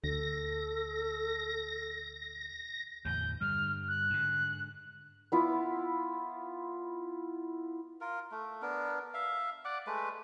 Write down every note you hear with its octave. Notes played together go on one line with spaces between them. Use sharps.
D2 A4 A#6
E2 A2 D3 G6
G2 D3 G3 F6
F#6
G#2 D3
B3 E4 F4
F4 A#4
A3
B3 D4 A#4
E5 F5
D5 F#5 D6
G#3 A3 B4